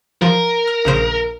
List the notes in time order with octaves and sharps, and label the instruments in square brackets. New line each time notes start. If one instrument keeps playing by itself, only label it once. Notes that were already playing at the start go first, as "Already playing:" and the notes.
[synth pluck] F3 [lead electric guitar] A#4
[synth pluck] F6
A#1 C#3 C5